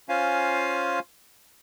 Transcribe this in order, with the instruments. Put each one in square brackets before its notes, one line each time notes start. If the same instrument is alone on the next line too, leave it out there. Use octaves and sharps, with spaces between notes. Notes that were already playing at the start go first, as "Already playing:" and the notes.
[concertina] C#4 F4 C5 F5 G#5